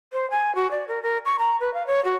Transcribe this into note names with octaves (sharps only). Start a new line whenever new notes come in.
C5
G#5
F#4
D5
A#4
A#4
C#6
A#5
B4
F5
C#5
F#4